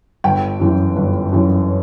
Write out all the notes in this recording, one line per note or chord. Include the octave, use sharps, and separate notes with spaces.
G1 G5
F#2 E3
G1
F#2 E3